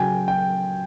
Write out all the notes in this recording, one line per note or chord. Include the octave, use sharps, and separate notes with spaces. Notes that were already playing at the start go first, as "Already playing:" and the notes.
Already playing: C#3 F#3 G5 G#5
G5